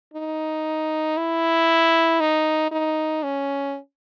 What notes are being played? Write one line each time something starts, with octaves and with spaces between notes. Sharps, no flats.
D#4
E4
D#4
D#4
C#4